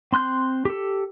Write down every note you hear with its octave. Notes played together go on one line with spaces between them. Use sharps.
C4 C6 F#6 G6
G4 A4